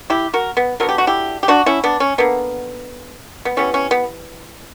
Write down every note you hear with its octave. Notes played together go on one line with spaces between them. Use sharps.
E4 G4
F#4 A#4
B3
D3 F#3 B3 A#4
G4
F#4
E4 G4
G4
D4 F#4
C#4 E4
B3 D4
C#4
D3 A#3 B3
B3
E3 G3 B3 C#4
C#4
B3